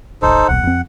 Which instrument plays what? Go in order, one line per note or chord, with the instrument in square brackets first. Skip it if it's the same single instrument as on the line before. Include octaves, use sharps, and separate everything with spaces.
[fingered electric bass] D#1 A1 [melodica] D#4 A4 C5
[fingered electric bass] D#1 B1 A#2 [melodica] F#5
[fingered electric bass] F2 C4